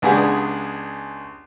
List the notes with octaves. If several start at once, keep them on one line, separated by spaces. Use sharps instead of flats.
C#2 B3 D4 G4 G#4